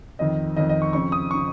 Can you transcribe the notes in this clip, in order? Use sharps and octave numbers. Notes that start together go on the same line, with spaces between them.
F2 D#3 D#5
F2 D#3 D#5
D#5
C#6
F2 C#3 C#6
D#6
C#3 C#6